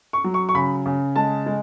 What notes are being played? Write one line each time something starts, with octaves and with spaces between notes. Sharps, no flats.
C#6
F#3
C#6
C#6
C#3 B5
C#3
G#3 A5
G#3